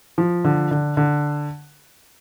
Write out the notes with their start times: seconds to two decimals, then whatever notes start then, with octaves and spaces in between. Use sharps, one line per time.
0.18 F3
0.44 D3
0.71 D3
0.97 D3